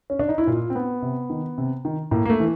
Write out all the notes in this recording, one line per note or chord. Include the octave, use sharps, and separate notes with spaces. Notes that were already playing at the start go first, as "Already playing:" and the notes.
C#4
D4
D#4
E4
A#2 F4
C4
B3
C3
D#3
C3
D#3
A2 A#3
A#3
A3
E3